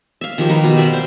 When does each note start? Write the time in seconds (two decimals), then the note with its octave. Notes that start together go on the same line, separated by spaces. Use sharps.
0.21 E5 F5
0.38 D#3 F3 G4 C5
0.49 D#4 G4 B4 F5
0.64 B2
0.77 C5 D5 E5 F5
0.93 C5